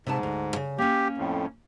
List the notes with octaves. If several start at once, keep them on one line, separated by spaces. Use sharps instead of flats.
G#2 C3 B4 A5
D2
C#3
A#3 C#4 G4
F2 A2